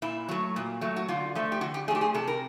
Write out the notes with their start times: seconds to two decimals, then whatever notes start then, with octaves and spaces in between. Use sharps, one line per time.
0.02 A#2 E4
0.29 F#3 A3
0.56 A#2
0.81 F#3 A3
0.96 F#4
1.08 D3 F4
1.35 F3 A3
1.52 G4
1.61 D3 F#4
1.74 G4
1.88 A3 G#4
1.91 F3 G4
2.01 G#4
2.14 C3 A4
2.27 A#4